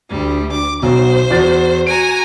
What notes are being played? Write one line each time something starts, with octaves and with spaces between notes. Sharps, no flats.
D2 G3
D6
B1 B2 C5
E2 F#4 A6
F#4 G#5 A#5 D7